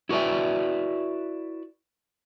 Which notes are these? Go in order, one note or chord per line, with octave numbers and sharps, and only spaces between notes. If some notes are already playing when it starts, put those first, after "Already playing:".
E4 F#4 B4 D5 E5